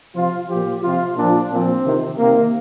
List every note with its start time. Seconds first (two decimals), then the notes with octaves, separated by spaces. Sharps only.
0.15 C3 F3 F4
0.48 A#2 F3 G4
0.82 C3 F3 F4
1.16 A#2 F3 D4
1.50 A#2 C4
1.56 F3
1.85 C3 D#3
2.19 C3 D#3 A#3